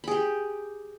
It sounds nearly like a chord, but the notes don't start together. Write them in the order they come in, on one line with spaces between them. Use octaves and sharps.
B5 G#4 G4